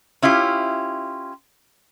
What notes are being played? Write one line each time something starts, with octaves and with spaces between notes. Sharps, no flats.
C#4 E4 F4 G4